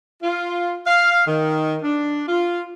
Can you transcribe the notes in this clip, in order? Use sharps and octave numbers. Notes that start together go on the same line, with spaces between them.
F4
F5
D#3
D4
F4